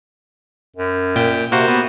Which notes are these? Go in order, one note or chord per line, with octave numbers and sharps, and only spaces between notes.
F#2
A#2 G5 B6
C3 A#3 F#4 C5
B3